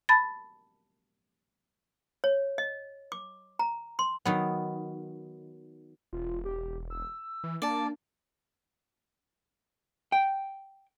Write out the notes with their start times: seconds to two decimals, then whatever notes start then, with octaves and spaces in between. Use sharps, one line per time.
0.09 A5 B5 A6
2.24 C#5
2.58 D#5
3.12 D6
3.59 A#5
3.99 C6
4.25 D#3 F#3 B3
6.13 E1 F4
6.45 G4
6.90 E6
7.44 E3
7.62 A#3 D4 D5 A5
10.12 G5